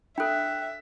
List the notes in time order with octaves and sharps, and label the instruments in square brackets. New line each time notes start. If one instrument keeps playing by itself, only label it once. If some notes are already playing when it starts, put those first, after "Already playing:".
[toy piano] D4 A4 [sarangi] E5 [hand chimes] G5 F#6